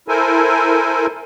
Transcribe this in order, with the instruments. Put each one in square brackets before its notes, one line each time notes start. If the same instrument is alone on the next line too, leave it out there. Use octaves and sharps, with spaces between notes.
[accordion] E4 A4 A#4 C5 G#5